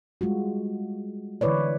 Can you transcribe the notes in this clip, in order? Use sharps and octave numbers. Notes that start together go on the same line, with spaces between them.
G3 G#3 F4 F#4
D3 E3 E4 B4 C#5 D5